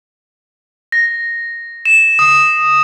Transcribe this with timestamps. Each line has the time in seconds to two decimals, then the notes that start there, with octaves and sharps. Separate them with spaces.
0.92 A#6
1.85 E7
2.19 D#6